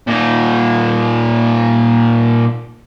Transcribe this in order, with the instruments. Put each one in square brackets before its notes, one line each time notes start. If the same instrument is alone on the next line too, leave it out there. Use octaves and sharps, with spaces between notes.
[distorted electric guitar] A#2 D#4